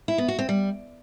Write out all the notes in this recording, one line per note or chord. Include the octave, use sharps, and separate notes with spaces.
E4
B3
F#4
C4
G3